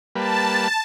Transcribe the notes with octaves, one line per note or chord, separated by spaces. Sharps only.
G3 A#3 B4 A5